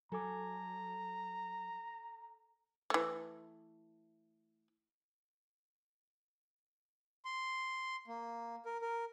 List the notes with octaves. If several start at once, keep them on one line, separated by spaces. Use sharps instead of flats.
F#3 A4 G#5 A#5 D6
E3 A3
C6
A#3
A#4
A#4